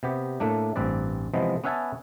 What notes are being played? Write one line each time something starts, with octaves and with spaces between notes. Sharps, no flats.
C3 B3 G4
A2 A3 A#3 D4
A1 G2 C4 B4 D5
C3 E3 F3 G#3 B3
B3 C#4 B4 E5 G#5 A5